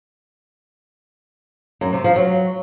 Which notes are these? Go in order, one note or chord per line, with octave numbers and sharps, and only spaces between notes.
F#2
C3
F3
F#3